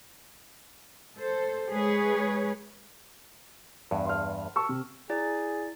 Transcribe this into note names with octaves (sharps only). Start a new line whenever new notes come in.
A4 C5
G#3 G#4 B4 C#5
E2 G2
C6 F6
A5 C#6 E6
C3
E4 G#4 D5 A6